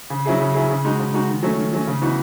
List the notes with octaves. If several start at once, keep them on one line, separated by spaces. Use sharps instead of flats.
C#3
F#3 C#4 E4 G#4
C#3
F#3 C#4 E4 G#4
C#3
G#3 D#4 F#4
C#3
G#3 D#4 F#4
D#3
F#3 A3 C#4
D#3
F#3 A3 C#4
C#3
E3 B3 D#4 F#4